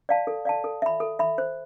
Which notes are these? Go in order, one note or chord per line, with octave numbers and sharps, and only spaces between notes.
D5 F5 A5
A4
D5 F5 A5
A4
E5 B5
A4
E5 B5
C5